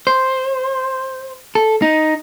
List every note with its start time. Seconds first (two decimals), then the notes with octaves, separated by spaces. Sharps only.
0.07 C5
1.55 A4
1.82 D#4